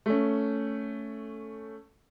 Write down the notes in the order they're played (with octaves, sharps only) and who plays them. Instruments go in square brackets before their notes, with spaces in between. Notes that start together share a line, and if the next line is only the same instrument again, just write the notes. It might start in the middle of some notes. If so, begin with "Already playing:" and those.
[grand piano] A3 C#4